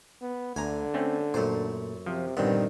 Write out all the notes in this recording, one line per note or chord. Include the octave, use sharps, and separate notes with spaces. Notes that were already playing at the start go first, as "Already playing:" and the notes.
B3
D2 D3 G#5 A#5
A3 C4 C#4
F#2 A#2 A3 C5
C3 F3
A#1 G2 D3 D#3 B3 C4